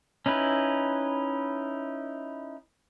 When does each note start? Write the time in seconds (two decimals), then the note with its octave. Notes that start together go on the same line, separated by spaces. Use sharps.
0.26 C#4 D#4 E4 B4